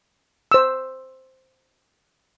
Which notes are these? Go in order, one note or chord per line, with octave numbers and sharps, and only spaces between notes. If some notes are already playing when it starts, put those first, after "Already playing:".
C5 E6